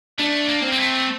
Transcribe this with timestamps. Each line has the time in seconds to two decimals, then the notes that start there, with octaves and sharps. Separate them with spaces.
0.18 A3 D4
0.48 A#3
0.62 C4
0.72 G3
0.78 A3